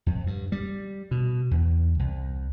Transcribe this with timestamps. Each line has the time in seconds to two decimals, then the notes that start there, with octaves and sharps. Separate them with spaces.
0.06 F2
0.27 G2
0.52 G3
1.11 B2
1.51 E2
1.99 C2